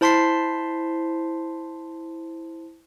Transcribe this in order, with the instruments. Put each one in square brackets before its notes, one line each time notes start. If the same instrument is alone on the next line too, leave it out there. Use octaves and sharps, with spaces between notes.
[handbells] E4 C5 A5 C6 B6 C7